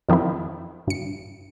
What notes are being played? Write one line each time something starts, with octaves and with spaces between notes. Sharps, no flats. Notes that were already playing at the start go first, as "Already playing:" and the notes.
F2 D#3 F3 C4 E4
G2 C#7